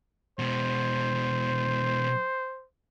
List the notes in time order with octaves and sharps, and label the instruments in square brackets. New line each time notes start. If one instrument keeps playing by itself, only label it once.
[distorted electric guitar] B2 G#3 [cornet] C5